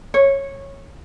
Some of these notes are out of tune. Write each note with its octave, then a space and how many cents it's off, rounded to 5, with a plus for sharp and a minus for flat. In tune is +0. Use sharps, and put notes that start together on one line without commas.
C#5 -15